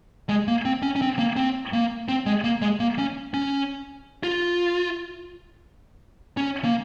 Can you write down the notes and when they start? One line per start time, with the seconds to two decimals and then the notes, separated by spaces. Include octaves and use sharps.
0.29 G#3
0.48 A#3
0.65 C4
0.83 C#4
0.96 C#4
1.02 C4
1.19 A#3
1.36 C4
1.73 A#3
2.08 C4
2.26 G#3
2.44 A#3
2.62 G#3
2.80 A#3
2.98 C#4
3.34 C#4
4.23 F4
6.37 C#4
6.64 A#3